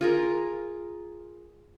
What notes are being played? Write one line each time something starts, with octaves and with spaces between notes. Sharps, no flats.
F4 G#4 A#4